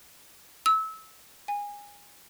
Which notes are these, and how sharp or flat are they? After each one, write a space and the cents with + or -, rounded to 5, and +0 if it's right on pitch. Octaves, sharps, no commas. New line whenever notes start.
E6 -25
G#5 -25